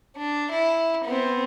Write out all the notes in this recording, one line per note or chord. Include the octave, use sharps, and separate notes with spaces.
D4
E4
B3 C4